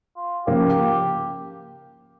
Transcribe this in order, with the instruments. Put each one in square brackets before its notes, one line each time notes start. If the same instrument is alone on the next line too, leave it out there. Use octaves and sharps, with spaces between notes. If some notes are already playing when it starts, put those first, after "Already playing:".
[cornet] F4
[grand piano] C#3 F3 A#3 [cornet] G4